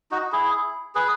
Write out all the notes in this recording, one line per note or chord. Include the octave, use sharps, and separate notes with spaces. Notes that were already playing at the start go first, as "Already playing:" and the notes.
D#4 F#4
E4 G#4
G#4 B4